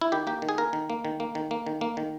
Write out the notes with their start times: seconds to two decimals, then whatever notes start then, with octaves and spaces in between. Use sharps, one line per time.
0.01 E4
0.12 D#3 G4
0.27 A#3 G4
0.42 D#3
0.49 G#4
0.58 A#3 A#4
0.73 D#3
0.90 A#3
1.05 D#3
1.20 A#3
1.35 D#3
1.51 A#3
1.67 D#3
1.81 A#3
1.97 D#3